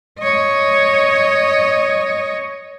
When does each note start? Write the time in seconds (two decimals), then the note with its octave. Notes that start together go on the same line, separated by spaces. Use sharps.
0.19 C#5 D#5